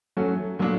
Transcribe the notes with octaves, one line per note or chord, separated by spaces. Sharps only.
F#3 A3 C#4 F#4 A4
A#2 F#3 A3 D4